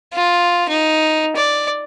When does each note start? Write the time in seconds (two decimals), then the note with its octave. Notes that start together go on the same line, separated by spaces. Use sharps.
0.13 F4
0.68 D#4
1.36 D5